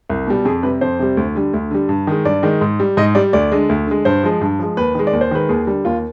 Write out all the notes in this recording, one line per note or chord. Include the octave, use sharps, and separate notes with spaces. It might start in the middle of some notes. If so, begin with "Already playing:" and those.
C2
B2 G3
F2 G#4
C3 G3 B4
F2 C5
C3 G3
D2
D3 G3
D2
D3 G3
G2
D#3 G#3
G2 D5
D#3 G#3
G#2
G3
G#2 D#5
G3 D5
D2 D5
D3 G#3
D2
D3 G#3
G2 C5
F3 G#3
G2
F3 G#3
D#2 B4
D#3 G#3
D5
D#2
C5
D#3 G#3 B4
D#2 G#4
D3 G3
D#2 F4